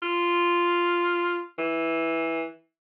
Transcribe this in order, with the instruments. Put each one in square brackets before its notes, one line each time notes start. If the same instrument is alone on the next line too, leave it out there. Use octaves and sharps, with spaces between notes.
[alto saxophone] F4
E3